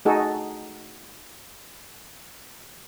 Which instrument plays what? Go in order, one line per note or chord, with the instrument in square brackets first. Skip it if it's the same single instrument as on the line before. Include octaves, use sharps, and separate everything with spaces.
[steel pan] A3 D#4 F#4 G#4 A4